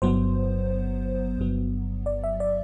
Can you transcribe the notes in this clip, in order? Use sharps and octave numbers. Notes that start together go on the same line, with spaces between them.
G1 G2 F#3 B3 C5
G1 G2 F#3 B3
D5
E5
D5